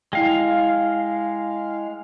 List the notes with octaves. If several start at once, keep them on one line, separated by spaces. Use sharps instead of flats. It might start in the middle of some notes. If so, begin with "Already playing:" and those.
G#3 E4 F5 G5